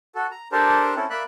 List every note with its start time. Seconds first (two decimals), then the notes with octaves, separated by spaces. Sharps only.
0.15 F#4 A4
0.31 A#5
0.52 D4 G4 A4 A#4 C5
0.96 C4 C#4 E4 A4
1.10 A#3 D5 E5 B5 F#6